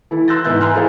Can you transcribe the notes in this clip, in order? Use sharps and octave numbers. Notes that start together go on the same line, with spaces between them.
E3 E4 A4
C6 E6 F#6 G6 A6 A#6
G#2 E3 B3 E5 F#6 G6
G#5 A#5 C6 F6 F#6
E4 G#4 A4 C5 F5